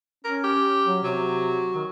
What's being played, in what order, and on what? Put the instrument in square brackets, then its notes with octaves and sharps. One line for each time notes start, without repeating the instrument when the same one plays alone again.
[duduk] C#4 [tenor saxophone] A#4
[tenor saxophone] G4
[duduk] F#3
[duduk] C3 [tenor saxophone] F#3
[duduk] D#3